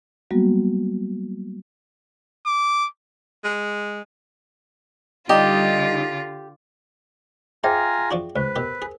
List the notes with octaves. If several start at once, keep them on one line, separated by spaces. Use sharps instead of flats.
F#3 G3 A#3 B3 F#4
D6
G#3
D3 G3 D#4 F4 G4 D#5
F4 G#4 C5 E5 G5 G#5 A#5
F3 D4 F#4
C#2 B4 C5
B2 G4 A#4
G#4